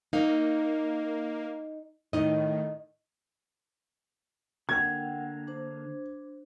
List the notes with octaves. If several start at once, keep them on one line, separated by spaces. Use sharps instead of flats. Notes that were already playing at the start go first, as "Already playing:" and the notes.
A#3 D#4 F5
A2 D#3 D#4 D#5
D3 A#3 F#5 G5 G#6
D4 C5